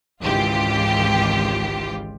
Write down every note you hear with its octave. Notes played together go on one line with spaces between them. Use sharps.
G#1 C#2 E3 F4 G4